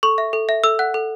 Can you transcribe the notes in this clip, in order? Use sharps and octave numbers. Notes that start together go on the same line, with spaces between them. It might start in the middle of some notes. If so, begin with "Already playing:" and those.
A4 C#6
E5
A4
E5
A4 E6
F#5 F#6
A4